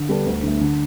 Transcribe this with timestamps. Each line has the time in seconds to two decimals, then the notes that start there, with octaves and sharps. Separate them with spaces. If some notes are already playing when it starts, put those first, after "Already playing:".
Already playing: D3
0.09 G3 B3 D4 A4
0.26 D2
0.43 D3 A3
0.61 D3